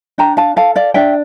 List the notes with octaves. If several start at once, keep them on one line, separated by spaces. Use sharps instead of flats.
D4 G5 A#5
F5 A5
A4 F5 A5
D5 F5
D4 E5 G5